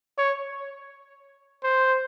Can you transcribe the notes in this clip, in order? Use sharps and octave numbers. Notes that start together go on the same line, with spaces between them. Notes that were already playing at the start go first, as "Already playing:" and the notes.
C#5
C5